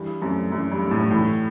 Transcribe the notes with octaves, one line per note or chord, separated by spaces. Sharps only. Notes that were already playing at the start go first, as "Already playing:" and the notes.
Already playing: G2 E3
F#2 A3 C4
F#2 E3
G2
A3 C4
A2
A2 E3